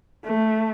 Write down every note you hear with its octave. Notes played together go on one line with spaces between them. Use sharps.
A3